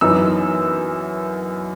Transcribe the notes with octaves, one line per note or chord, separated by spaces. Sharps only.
F#2 E3 B3 D#4 E6